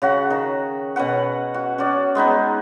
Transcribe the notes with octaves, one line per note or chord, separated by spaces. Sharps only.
C#3 F#4 F#5
D#3
B2 C#4 B4 F#5
F#4
C#4 F#4 D5
G#3 B3 D#4 B4